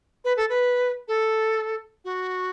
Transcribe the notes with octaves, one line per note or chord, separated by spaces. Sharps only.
B4
A4
B4
A4
F#4